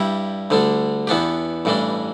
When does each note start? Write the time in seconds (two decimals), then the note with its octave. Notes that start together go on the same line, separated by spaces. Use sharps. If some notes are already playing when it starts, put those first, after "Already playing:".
Already playing: G2 G3 E4 G4
0.50 D2 D3 G3 D4
1.07 E2 E3 B3 D4 G4
1.65 A1 G2 E3 G3 D4